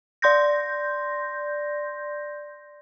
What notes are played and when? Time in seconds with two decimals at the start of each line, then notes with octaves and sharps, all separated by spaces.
0.22 D5 C6 G6 A#6